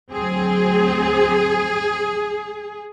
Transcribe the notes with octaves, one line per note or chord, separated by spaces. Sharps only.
D2 F#3 C4 G#4